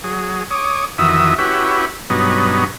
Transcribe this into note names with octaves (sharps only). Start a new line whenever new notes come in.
F#3 G#4
C#5 D6 D#6
F2 D#3 E3 F#4 E5 D#6
C#4 E4 F#4 G4 B4
G2 B2 F#3 B3 C#4 D#4